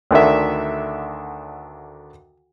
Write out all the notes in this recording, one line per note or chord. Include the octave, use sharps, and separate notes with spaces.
D2 D3 D#3 E5